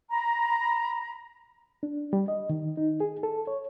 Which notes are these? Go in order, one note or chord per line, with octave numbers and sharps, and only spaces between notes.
A#5 B5
D4
G3
D#5
D#3
D#4
G#4
A4
C#5